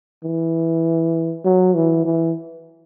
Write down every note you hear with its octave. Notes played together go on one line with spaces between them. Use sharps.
E3
F#3
E3
E3